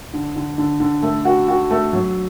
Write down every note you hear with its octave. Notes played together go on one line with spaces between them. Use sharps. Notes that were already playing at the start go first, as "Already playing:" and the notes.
D3
D3
D3
D3
A3
F#4
F#4
A3
F#3